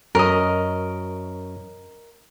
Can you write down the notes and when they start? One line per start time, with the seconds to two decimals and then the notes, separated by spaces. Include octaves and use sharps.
0.15 F#2 C#4 A#4 D#5